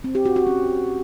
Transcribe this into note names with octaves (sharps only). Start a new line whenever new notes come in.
C4
G4
F#4
F#4
C#4